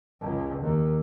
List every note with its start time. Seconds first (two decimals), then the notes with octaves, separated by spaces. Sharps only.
0.21 C#2
0.62 D#2